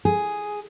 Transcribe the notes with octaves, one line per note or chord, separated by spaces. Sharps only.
G#4